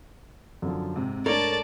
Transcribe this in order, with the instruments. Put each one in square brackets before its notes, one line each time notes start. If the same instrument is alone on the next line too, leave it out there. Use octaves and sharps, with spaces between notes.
[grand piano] F#2 D3 F3
[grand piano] G#2 [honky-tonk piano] C3
[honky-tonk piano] A3 D4 [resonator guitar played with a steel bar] A#4 C#5 [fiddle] D5 A5